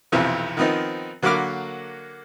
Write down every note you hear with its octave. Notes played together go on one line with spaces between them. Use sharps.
B1 F2 C3 E3 F3
D#3 F3 B3 C4 D#4
D3 F#3 A#3 B5 D6 F6